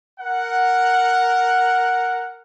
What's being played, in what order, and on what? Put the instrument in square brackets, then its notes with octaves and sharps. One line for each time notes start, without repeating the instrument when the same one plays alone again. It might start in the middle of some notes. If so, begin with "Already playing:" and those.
[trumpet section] A#4 F#5